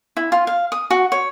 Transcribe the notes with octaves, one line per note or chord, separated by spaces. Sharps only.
E4
F4
F5
D#6
F#4
C#5